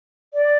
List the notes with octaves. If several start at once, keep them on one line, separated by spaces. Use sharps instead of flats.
D5